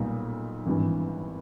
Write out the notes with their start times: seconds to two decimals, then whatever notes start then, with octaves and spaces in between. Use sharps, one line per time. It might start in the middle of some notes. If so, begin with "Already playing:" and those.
Already playing: B1 A#2 G3 B3 D#4
0.66 G#1 G2 E3